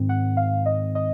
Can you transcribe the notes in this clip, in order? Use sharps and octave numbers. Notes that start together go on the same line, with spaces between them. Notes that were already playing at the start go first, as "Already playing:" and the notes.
Already playing: G#2 D#3 C4
F#5
F5
D#5
D#5